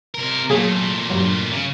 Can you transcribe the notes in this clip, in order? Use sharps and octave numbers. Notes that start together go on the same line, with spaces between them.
C3 A#4
A#2 F#3 A3 A#3 G#4
G2 F#3
C#3